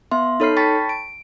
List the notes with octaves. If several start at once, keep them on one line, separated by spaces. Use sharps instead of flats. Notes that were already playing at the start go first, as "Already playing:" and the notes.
B3 E5 C6
D#4 A4 C#5 B5 F6 C7
G5 A5 B5 C#6 A6 B6
D7